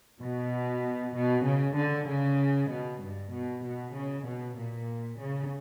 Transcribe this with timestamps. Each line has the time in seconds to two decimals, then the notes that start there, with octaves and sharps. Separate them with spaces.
0.20 B2
1.14 B2
1.45 C#3
1.76 D3
2.07 C#3
2.70 B2
3.01 G2
3.32 B2
3.63 B2
3.95 C#3
4.26 B2
4.57 A#2
5.20 C#3